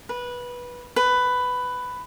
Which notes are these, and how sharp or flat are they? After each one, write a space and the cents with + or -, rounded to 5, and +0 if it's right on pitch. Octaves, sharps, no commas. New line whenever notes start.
B4 -15
B4 +10